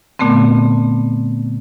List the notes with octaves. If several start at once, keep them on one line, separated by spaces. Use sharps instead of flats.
A#2 D3 A3 B3 C4